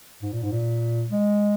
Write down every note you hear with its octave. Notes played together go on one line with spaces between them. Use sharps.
G#2
A#2
G#2
A#2
G#3